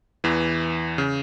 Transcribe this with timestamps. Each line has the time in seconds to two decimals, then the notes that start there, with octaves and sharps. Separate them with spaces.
0.24 E2 E3
0.98 C#3